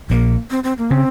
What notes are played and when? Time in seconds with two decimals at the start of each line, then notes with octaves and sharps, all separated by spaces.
0.10 A#1 A#2 A#3
0.51 C4
0.64 C4
0.78 A#3
0.91 C#3 C4